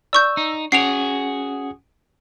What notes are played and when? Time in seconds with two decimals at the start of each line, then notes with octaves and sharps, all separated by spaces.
0.13 D5 C#6 E6 G6
0.37 D#4
0.72 C#4 F#4 G#4 F#5 C7 D7 F7